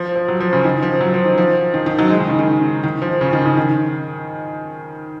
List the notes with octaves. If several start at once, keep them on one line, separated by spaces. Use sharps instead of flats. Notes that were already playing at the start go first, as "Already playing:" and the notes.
Already playing: F3
F3
F#3
F3
C#3
D#3
F3
F#3
F3
D#3
F3
D#3
D#3
F#3
G#3
D#3
C#3
D#3
D#3
F3
C#3
D#3
C#3
D#3